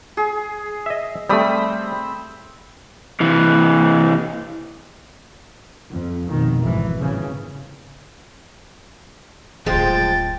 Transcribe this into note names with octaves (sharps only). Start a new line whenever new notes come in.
G#4
D#5 E5
G3 A3 C4 B5 D#6
C3 E3
F2
F1 B2 D#3
G#1 E3
G#1 C#3 E3
D1 G#1 F3 G#3 G#4 G5 A6